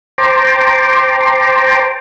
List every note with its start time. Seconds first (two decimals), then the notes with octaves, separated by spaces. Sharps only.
0.18 C5 G5 A5 A#5 C6 D6